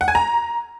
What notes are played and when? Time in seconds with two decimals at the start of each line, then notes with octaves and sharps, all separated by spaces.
0.01 F#5
0.08 G#5
0.15 A#5